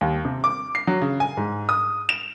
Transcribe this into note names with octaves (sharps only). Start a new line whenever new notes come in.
D#2
C3
D6
C7
F#3
C#3
G#5
G#2
D#6
E7